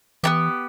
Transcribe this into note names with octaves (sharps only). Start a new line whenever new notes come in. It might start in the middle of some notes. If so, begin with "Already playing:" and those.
E3 B3 D4 G4